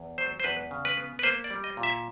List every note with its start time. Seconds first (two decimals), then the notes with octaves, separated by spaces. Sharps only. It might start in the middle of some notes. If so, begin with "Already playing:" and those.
Already playing: E2
0.18 F#3 C5
0.40 C5
0.44 E2 B4
0.71 C#3
0.85 B4
0.97 B3
1.19 B4
1.23 A#3 C5
1.44 D5
1.50 G3
1.64 D#5
1.77 A#2
1.83 E5